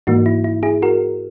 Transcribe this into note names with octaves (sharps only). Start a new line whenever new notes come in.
G#2 E3 A#3 D#4 F#4
E4
E4
E4 G#4
F#4 A#4